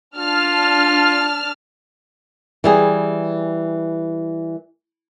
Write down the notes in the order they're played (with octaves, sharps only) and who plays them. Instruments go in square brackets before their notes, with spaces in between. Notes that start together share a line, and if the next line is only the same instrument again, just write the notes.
[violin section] D4 A5 F6 [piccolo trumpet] F4
[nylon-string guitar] E3 G3 G#4